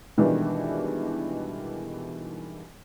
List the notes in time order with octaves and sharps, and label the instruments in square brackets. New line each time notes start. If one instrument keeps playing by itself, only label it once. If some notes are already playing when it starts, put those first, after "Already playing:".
[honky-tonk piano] B2 D#3 E3 G3 G#3 D4